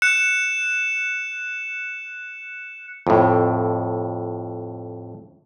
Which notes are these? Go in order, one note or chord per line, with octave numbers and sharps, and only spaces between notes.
F#6 C#7 E7
F2 A2